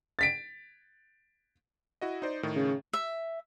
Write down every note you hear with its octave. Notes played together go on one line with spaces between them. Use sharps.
A6 B6 D7
E4 F#4 D#5
D#4 C5 D5
A2 D#3
C#3
E5